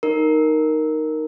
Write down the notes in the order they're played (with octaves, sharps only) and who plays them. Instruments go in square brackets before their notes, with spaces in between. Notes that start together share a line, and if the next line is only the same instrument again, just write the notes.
[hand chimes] D#4 A#4